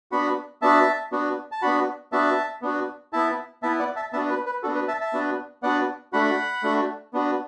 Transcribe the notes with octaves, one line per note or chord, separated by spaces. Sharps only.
B3 D4 F#4 F#5 B5
B3 D4 F#4 E5 A5
B3 D4 F#4
A5
B3 D4 F#4 F#5 B5
B3 D4 F#4 E5 A5
B3 D4 F#4
B3 E4 E5 A5
B3 E4 E5 A5
D5 F#5
E5 A5
B3 D4 F#4 E5 A5
B4
B4
B3 D4 F#4 A4
B4
E5 A5
E5 A5
B3 D4 F#4
B3 D4 F#4 D5 F#5
A3 D4 F#4 F#5 B5
A3 D4 F#4
B3 D4 F#4